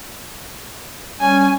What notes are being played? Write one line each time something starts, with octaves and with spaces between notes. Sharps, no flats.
G3 C#4 G#5